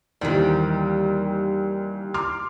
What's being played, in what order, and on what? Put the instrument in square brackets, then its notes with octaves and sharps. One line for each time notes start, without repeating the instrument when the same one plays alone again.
[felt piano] D#2 E3 [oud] D#3 G3
[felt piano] C6 D6 F6